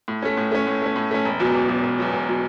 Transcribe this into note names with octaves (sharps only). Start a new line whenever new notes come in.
A2
A3 C#4
A2
A3 C#4
A2
A3 C#4
A2
A3 C#4
E1
E2 B2 F#3
E1
E2 B2 F#3
E1
E2 B2 F#3
E1
B2 F#3